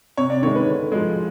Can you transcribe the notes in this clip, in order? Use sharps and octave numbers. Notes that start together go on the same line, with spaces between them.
C3 C#5
D5
D#3 G#3 C#5
B4
D3
F3 G#3